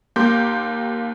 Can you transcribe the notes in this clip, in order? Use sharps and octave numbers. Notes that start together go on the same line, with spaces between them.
D#2 A#3 G4 C6 D6 G6